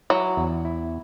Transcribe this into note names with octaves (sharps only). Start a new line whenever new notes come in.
F#3 E4
E2
E4